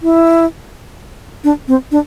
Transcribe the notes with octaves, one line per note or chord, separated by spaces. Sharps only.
E4
D4
C4
D4